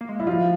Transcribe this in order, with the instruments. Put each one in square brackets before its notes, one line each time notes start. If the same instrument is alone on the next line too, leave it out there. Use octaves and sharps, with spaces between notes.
[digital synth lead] A#3
G#3
[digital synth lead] G3 [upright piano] E4
[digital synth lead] F3 [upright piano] F4